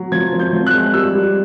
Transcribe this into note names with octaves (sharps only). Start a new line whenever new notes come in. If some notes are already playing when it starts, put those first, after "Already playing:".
Already playing: F#3
F3 G#6
F3
G6
F3
F#6
G#3
G3 E6
G3